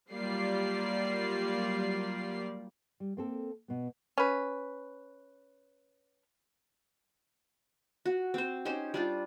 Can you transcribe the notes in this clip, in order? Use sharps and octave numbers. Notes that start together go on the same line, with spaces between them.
F#3 G3 A#3 F4 D5 C7
G3
A#3 C4 A4
B2 B3
C#4 B4
F#4
C4 C5
C#4 D#4 G4 C5
G3 D4 F4